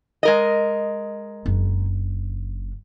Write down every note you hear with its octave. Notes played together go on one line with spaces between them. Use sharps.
G#3 A#4 D#5
F#1 D4